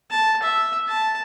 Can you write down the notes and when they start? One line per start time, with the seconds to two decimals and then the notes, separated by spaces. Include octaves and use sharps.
0.11 A5
0.43 E5
0.88 A5